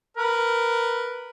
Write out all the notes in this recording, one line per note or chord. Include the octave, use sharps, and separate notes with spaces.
A#4 B4